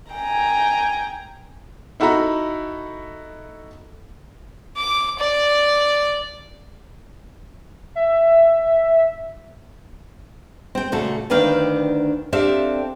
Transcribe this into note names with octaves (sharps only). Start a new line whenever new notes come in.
G5 G#5 A#5
D#4 E4 F#4 A4 A#5 B5
D6
D5
E5
C4 G5
A#2 C#3 A3 F#4 A4
D2 D#3 D4 B4 F5 G5
C4 D4 G4 A4 E5 F5